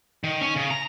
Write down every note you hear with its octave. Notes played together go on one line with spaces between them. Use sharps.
D#3
C#4
C#3
A#5